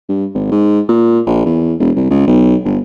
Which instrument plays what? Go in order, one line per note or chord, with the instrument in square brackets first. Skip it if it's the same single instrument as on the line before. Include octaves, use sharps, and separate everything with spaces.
[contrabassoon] G2
G#1
G#2
A#2
A#1
E2
E1
C2
C#2
B1
G1